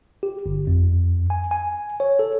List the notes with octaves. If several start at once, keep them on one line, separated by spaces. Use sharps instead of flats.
G4
G1
F2
G#5
G#5
C#5
A4